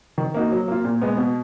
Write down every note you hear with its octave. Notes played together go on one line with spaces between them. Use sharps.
D#3
A#3 D#4 F#4
F#3
A#3 F4
A#2
G#3 B3
B2